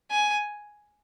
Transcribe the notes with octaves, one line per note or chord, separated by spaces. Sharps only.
G#5